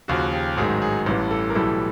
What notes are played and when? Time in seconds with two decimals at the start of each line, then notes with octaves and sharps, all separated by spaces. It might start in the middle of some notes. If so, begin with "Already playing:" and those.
0.08 D#2 C#3 F3 F#4
0.33 G4
0.57 A1 G#2 D#3 F#3 G#4
0.82 G#4
1.06 A1 G2 E3 G3
1.31 A4
1.50 A#4
1.55 B1 A2 E3 G3 A4